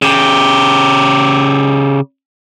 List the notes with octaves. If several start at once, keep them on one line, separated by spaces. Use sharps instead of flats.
C#3 G4